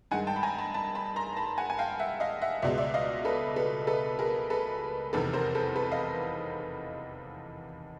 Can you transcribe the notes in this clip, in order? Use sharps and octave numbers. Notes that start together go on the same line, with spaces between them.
G2 D#3 G#3 F#5 G#5
G5 A5
B5
G#5 A#5
A5 B5
A5 B5
A5 B5
A#5 C6
A5 B5
F#5 G#5
G#5
F5 G5
E5 F#5
D#5 F5
E5 F#5
C#2 B2 G#3 D5 E5
D5 E5
D#5 F5
A4 B4
A4 B4
A4 B4
G#4 A#4
A4 B4
F1 E2 C3 D#3 A4 B4
A#4 C5
A4 B4
A4 B4
D#5 F5